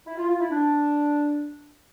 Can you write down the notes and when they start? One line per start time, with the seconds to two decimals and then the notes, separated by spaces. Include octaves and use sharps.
0.06 E4
0.17 F4
0.28 F4
0.40 E4
0.50 D4